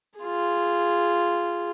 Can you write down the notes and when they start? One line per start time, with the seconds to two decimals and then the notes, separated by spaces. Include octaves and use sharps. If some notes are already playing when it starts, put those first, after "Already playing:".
0.19 F4 G#4